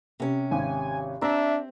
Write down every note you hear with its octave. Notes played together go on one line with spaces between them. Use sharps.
C3 C#4
G#1 G#5
C4 D4 E5 A#5